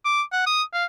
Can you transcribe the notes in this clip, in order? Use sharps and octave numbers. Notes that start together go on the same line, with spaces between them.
D6
F#5
D#6
F5